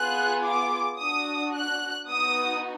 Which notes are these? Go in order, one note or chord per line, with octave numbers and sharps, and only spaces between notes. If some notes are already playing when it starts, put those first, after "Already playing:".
Already playing: B3 F4 G#4 F#6
D6
D4 F#4 D#6
F#6
B3 D#4 F#4 D#6